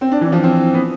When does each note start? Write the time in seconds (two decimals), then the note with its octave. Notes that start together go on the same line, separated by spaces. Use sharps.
0.01 C4
0.12 D4
0.21 E3
0.32 F3
0.43 C4
0.74 B3